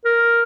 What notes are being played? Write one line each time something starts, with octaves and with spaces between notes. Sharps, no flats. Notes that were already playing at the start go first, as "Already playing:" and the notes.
A#4